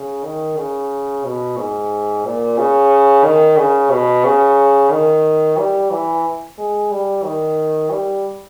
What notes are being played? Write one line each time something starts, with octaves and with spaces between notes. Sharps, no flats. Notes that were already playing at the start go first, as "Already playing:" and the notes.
Already playing: C#3
D#3
C#3
B2
G#2
A#2
C#3
D#3
C#3
B2
C#3
D#3
G3
E3
G#3
G3
D#3
G3